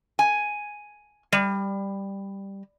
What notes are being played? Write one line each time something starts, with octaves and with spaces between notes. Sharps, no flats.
G#5
G3